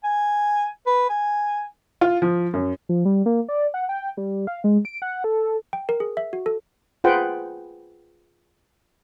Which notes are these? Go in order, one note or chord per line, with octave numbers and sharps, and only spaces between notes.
G#5
B4
G#5
F4
F3
F#2
F3
G3
A#3
D5
F#5
G5
G3
F5
G#3
D7
F#5
A4
G5
A#4
G#4
E5
F#4
A4
F4 G#4 B4 C5 F#5 G5